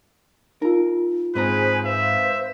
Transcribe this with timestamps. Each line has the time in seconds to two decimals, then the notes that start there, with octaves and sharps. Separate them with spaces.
0.62 D#4 F4 A#4
1.35 G#2 C4 G#4 B4 C5 A#5
1.85 B4 C5 E5 F5